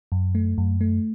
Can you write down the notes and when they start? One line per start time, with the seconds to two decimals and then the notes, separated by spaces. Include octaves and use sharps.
0.12 F#2
0.35 A3
0.58 F#2
0.81 A3